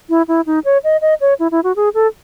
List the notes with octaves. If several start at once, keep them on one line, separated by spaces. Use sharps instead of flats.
E4
E4
D#4
C#5
D#5
D#5
C#5
E4
E4
F#4
G#4
A4